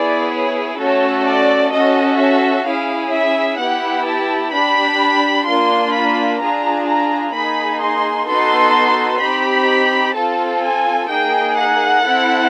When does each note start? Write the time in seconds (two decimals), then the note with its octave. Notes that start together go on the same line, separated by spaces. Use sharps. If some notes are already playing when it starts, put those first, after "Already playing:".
Already playing: B3 E4 G#4 D5
0.32 C#5
0.78 A3 C#4 F#4 A4 C#5
1.25 D5
1.72 C#4 F#4 A4 D#5
2.19 E5
2.65 C#4 E4 G#4 F5
3.12 E5
3.59 B3 E4 G4 F#5
4.06 A5
4.53 D4 G4 B5
5.47 A#3 D4 F4 C6
5.93 B5
6.40 D4 F4 G#4 A#5
6.88 A#5
7.34 A#3 D#4 G#4 B5
7.81 C6
8.28 B3 D#4 F#4 A4 C6
9.21 C4 D#4 G4 B5
10.15 C4 F4 A4 A5
10.62 G#5
11.08 A#3 D#4 G#4 G5
11.56 F#5
12.03 C4 E4 A4